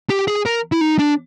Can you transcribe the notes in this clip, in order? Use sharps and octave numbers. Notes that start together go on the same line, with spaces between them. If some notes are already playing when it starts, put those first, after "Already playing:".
G4
G#4
A#4
E4
D#4
D4